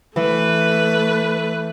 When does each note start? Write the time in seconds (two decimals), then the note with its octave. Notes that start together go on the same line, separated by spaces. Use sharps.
0.16 E3 A3 B4